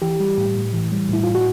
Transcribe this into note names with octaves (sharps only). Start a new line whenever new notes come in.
E3 G4
G3
A2
A2
E3
G3
A2 E4
A2 F4
F#4